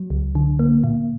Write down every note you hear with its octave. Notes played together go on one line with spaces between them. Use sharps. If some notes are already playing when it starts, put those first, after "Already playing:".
Already playing: F#3
C#2
D3
A#3
A#2